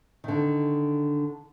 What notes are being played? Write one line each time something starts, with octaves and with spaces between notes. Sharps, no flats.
D3 D#3